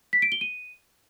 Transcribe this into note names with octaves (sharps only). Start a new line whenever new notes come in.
B6
D7
G7
D#7